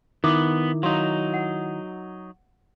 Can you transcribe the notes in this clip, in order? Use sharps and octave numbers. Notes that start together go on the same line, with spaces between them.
D#3 B3 E4 F#4 D6 D#6
F#3 D#4 F5 A#5 C6
F#5